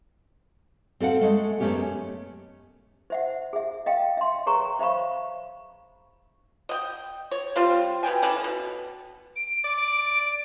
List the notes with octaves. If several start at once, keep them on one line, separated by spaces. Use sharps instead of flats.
C4 A4 F5 F#5
G#3 A3
F#2 F3 A3 B3 C#4 G4
C5 E5 F#5
G#4 E5
D#5 F5 G5
E5 C6
G#4 B4 C#5 A#5 C#6
C5 E5 F5 B5 C#6
D#5 G5
C#5
G3 C4 F4
B2 B3 G5 G#5
D3 C#4 E4 B4
B2
D7
D5